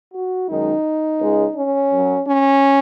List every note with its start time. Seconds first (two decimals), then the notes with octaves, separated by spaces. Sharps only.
0.13 F#4
0.48 F#2 D#3 G#3 D#4
1.19 C#2 C#3 G#3
1.55 C#4
1.91 F#2 F#3
2.26 C#4